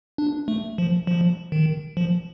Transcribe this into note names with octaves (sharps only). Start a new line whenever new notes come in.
D4
A3
F3
F3
D#3
F3